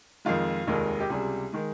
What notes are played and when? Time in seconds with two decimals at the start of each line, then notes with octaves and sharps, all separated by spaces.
0.25 F2 D#3 G#3 F4
0.67 F1 D#2 D#3 G#3
1.00 G4
1.09 C#2 C3 G3 G#4
1.53 D#3 G#3